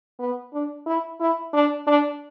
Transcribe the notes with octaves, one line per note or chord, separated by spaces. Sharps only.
B3
D4
E4
E4
D4
D4